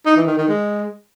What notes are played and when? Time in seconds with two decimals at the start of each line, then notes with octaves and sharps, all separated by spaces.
0.06 D#4
0.16 E3
0.27 D#3
0.38 D#3
0.48 G#3